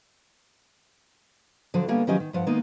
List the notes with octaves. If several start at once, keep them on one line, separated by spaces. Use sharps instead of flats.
D3 F3 F#3
D3 G3 A#3 B3 C#4
D#3 F3 F#3 C#4 G4 D#5
D#3
G2 F3 F#5
D#3 G#3 A#3 B3 D#4